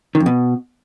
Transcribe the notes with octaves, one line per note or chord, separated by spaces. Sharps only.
D#3
F2
B2